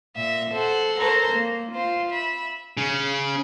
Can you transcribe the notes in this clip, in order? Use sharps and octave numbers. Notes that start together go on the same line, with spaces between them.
A#2 E5
A4 C5 F#5
A4 A#4 C5 C#5 A#5
A#3
F4 C5
E5 B5
C#3 C#4